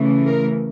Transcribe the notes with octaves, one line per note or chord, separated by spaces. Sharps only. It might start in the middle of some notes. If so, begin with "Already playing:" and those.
Already playing: C#3 E3 A3
A#4